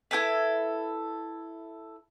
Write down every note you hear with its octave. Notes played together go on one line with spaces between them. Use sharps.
E4 G4 A4 B4